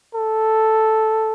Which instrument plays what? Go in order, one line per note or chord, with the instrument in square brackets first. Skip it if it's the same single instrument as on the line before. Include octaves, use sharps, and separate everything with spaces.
[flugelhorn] A4